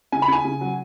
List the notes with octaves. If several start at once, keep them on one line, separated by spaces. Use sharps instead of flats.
C#3 G#5
B5
C#3 G#5
C#3
F#3